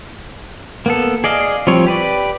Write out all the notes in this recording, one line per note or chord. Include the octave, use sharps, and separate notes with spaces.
A#3 B3 A4
G#4 D5 D#5 F5
F3 G3 C4 C#5
G4 B4 D5